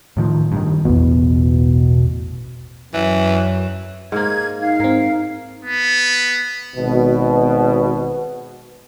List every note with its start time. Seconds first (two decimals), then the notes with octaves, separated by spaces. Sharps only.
0.17 A2 D#3 F3
0.52 G2 D#3
0.85 A1 E2 B2
2.94 F#2 E3
4.12 G#2 A#3 G#6
4.61 D#4 F5
4.80 G#2 C4 A#4
5.65 B3
6.75 G#1 B2